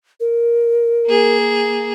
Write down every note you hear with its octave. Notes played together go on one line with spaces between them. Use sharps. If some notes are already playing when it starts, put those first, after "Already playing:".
A#4
A#3 G#4